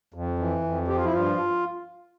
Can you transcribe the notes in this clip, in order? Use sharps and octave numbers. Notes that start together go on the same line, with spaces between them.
F2
E3
F2
F3 G4
F4
E4
G2 F4